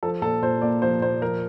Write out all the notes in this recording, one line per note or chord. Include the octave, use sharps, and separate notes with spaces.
F3 A4
A#2 A4
A#2 C5
A#3 D5
F3 C5
A#2 C5
F3 A#4